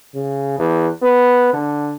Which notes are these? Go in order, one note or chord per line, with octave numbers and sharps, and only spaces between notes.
C#3
E2
B3
D3